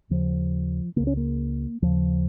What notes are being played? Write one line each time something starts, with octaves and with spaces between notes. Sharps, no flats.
D#2 C#3 F3
C#2 C#3 A#3
C#4
A#3
D#2 C#3 F3